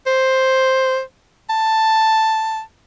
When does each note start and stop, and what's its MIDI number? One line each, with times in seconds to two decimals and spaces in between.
0.06 1.01 72
1.50 2.61 81